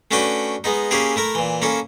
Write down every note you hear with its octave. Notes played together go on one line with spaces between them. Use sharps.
A3 C#4 D4 F#4 B4 G5
G#3 B3 D#4
A#3 C#4 E4 G4 G#4
A3 E4 A#4
A#2 E3
A#3 C#4 E4 A4